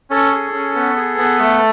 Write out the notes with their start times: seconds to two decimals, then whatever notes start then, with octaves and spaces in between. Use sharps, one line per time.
0.10 C#4 A4
0.32 G#4
0.53 C#4
0.75 B3
0.96 G#4
1.18 B3
1.39 A3